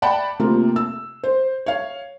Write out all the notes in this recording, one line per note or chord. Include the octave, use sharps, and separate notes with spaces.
D5 F#5 G5 A5 B5
C3 A3 A#3 F4
E6
C5
C#5 F5